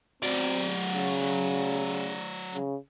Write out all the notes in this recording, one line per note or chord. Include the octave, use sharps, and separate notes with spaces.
F#3 C4 D5
C#3
C#3